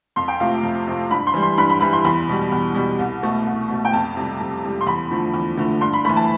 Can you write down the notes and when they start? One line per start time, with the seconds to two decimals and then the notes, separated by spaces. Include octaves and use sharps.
0.16 F2 C6
0.28 G5
0.40 C3 F3 A3 F5
0.63 F2
0.87 C3 F3 A3
1.10 G2 B5
1.27 C6
1.34 E3 G3
1.42 C6
1.58 G2 B5
1.70 B5
1.81 E3 G3 B5
1.93 C6
2.05 E2 B5
2.28 B2 G3
2.52 E2
2.75 B2 G3
2.99 C2
3.23 B2 A3
3.46 C2
3.70 B2 A3
3.85 G5
3.93 F2 A5
4.16 C3 G3
4.40 F2
4.64 C3 G3
4.81 C6
4.86 E2 B5
5.11 D3 F3 A3
5.34 E2
5.57 D3 F3 A3
5.81 G2 C6
5.93 B5
6.05 E3 A3 B5
6.16 A5